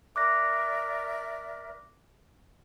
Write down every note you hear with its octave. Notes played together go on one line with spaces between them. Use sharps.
A#4 D5 E5 D6 F#6 A#6